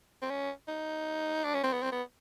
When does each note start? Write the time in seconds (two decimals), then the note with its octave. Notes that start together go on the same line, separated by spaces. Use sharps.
0.22 C4
0.30 C#4
0.68 D#4
1.44 D4
1.54 C#4
1.63 C4
1.73 B3
1.83 C4
1.92 B3